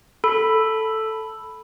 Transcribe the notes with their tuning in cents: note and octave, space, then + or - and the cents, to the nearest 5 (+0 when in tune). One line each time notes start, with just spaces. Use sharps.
A4 +0 B5 +0